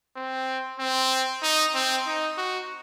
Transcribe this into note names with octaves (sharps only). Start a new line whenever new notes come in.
C4
C4
D#4
C4
D#4
F#4